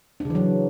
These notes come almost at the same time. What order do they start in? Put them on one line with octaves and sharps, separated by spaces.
D4 C#3 E3 F#3